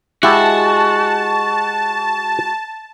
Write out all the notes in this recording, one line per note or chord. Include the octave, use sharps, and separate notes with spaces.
G#3 E4 F#4 G4 G5 A5